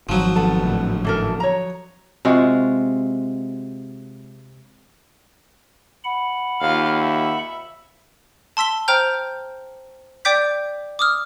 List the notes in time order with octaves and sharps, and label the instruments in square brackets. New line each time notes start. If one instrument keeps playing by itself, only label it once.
[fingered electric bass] G#1 D#3 [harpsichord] F3 F#3
[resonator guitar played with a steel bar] B3 A4
[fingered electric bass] G#1 A2 D3
[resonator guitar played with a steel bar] E3 A4 A#4
C#5 A#5
[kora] C3 G#3 F4 F#4
[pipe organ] F#5 B5
[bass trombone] D#2 [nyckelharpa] F4 F5
[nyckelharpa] E5
[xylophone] A5 C6 E6 B6 G7
C5 G5 A#5 F6 G6
D5 G5 D6 G6 B6
D6 D#6 F6